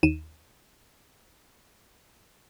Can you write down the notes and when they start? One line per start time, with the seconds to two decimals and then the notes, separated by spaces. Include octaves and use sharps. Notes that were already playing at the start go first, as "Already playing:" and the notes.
0.03 D#2 D#7 E7